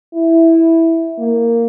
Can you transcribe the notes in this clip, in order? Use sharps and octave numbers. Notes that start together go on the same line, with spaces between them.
E4
A#3